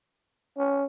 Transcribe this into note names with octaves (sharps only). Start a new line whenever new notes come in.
C#4